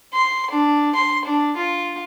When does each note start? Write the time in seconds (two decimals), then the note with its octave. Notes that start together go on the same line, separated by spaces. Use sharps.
0.14 C6
0.51 D4
0.95 C6
1.25 D4
1.57 F4